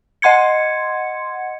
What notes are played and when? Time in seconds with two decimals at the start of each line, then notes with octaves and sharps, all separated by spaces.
0.22 D#5 F#5 C6 G#6 C#7